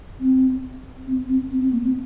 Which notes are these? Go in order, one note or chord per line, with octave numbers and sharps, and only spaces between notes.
C4
C4
C4
C4
C4
A#3
C4